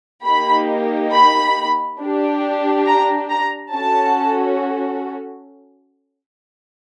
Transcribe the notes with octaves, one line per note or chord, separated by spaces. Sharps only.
A#3 D#4 G4 B5
B5
D4 G4
A#5
A#5
C#4 F#4 A4 A5